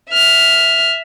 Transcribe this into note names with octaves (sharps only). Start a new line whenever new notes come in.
E5 F6